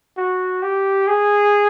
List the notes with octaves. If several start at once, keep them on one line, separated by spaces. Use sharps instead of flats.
F#4
G4
G#4